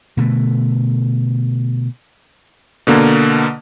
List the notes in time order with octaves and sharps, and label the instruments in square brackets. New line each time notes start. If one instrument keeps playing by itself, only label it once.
[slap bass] B2 D3 A3
[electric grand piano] B2 D3 A#3